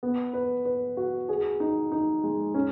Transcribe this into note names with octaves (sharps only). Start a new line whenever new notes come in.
B3
B4
B4
F#4
G#4
D#4
D#4
G#3
C#4